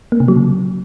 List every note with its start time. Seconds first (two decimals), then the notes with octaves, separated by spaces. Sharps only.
0.12 A#3
0.20 C3
0.28 F#3
0.37 C#3